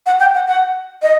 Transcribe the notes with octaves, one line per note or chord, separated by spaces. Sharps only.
F#5
G5
F#5
F#5
D#5